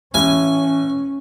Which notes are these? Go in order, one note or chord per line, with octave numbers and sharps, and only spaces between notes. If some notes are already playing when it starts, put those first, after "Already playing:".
A1 C#4 G#5